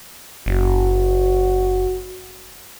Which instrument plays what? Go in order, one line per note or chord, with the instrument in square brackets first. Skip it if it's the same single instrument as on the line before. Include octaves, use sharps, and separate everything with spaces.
[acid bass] F#1 [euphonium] F#4